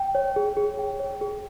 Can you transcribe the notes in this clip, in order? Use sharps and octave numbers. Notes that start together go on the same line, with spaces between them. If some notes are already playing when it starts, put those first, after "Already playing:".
Already playing: G5
C#5
G#4
G#4
G5
C#5
G#4